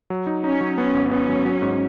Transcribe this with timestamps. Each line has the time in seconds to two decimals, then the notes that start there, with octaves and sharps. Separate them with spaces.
0.10 F#3
0.27 D#4
0.44 C#4 D#4
0.61 F#3
0.78 B3 C#4
0.94 G#1
1.11 B3 C#4
1.29 F#3
1.45 F#3
1.62 G#2